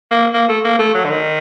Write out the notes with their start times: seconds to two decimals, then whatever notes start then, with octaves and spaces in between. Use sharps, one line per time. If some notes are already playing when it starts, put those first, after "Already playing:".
0.11 A#3
0.34 A#3
0.49 A3
0.64 A#3
0.79 A3
0.94 F#3
1.04 D3
1.10 D#3